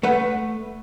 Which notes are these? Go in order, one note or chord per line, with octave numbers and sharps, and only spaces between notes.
A3 B4 F#5